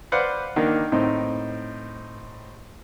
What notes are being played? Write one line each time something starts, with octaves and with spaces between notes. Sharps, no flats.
B4 C5 D5 F5 F#5
D#3 A#3 D4
A2 C4 D#4